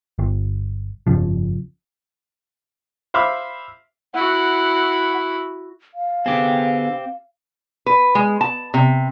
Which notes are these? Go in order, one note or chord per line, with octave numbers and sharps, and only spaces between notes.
G1
G1 F2 C#3 F3
C5 E5 F5 B5 D6
E4 F#4 F#5
F5
D3 B3 C4 G4 G#4
B4
G#3
A5
C3